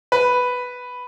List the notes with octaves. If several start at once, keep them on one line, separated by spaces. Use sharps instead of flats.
B4